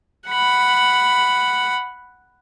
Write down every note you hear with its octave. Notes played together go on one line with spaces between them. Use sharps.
F#5 B5